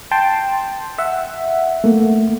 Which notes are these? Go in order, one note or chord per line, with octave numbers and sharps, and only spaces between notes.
G5 A5 C6
E5 F#5
A3 A#3